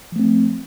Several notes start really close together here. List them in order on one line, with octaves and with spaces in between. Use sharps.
F3 A3 C4